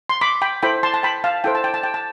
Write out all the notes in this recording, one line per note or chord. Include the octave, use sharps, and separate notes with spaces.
C6
B5 D6
G5 B5
E4 A4 C5 G5 B5
A5 C6
A5
G5 B5
F5 A5
E4 A4 C5 G5
A5
G5
A5
G5
A5